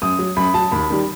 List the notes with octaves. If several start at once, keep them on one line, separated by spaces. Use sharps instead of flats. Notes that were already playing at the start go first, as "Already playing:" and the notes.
F#2 D#6
F#3
F#2 B5
F#3 A5
D#2 B5
D#3 G3